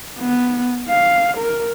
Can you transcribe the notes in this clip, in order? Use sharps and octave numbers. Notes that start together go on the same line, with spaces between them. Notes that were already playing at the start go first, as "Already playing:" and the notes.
B3
F5
A#4